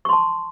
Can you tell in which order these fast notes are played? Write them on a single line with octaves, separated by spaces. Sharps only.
C#6 C6 A5